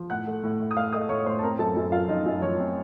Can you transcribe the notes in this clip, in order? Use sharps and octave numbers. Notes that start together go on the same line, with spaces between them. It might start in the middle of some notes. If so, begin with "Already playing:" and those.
Already playing: F3
A2 F#5 F#6
A3
A2
A2
D#6
A3 F5 F6
A3 D#5 D#6
A2 C#5 C#6
A2 C5 C6
A5
C4 A#4 A#5
F#2 A4 A5
F#2
F#2 F4 F5
F3 D#4 D#5
F#2
F3 C#5
C4